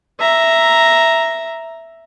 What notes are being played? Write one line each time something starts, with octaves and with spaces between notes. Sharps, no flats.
E5 A#5